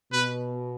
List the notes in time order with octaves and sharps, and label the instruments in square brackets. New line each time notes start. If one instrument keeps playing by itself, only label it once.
[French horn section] B2 [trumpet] B4